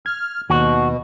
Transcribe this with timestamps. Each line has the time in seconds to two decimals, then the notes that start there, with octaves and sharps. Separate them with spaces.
0.06 F6 G#6
0.50 D#2 B2 F#4